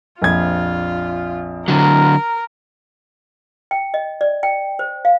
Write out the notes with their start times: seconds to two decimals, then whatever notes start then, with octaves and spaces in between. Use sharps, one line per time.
0.22 A#1 F2 F4 G#6
1.68 D3 F#3 A#4
3.71 G5
3.94 D#5
4.21 D5
4.43 G5
4.79 C5
5.05 F5